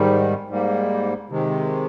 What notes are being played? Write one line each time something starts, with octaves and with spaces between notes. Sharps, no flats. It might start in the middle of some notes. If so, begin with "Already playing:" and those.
Already playing: G#2 D#3 G3
G#2 G3 A#3
C3 D#3 G#3